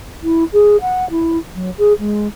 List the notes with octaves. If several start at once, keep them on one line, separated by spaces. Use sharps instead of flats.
E4
G#4
F#5
E4
F#3
G#4
G#3